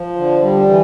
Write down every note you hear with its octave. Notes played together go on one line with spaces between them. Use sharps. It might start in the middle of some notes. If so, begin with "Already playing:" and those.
Already playing: F3
D3
G3
E3